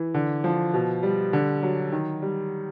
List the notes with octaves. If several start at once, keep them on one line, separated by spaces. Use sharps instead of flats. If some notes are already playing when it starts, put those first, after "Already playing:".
Already playing: E3
D3
F3
B2
G3
D3
F#3
D#3
G3